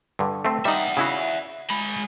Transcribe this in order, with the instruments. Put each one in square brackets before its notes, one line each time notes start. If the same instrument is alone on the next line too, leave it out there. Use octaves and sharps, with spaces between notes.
[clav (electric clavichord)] G2 D3
A3 C4
[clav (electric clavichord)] G3 D#4 [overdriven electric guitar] E5 F#5
[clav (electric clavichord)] C#3 E4 F#4
[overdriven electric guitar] G#3 B5